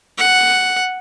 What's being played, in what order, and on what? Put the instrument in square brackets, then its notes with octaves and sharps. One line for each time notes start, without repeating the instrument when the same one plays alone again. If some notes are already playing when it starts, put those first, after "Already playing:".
[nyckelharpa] F#5